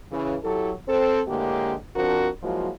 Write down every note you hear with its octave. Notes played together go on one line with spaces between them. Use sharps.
C#3 E3
F#3 E4 G4 A4
C4 A4 C5
D2 A2 D3 G#3 A#3 G4
F3 C4 D4 F#4 A#4
F3 F#3 G#3 A#3 E4 F#4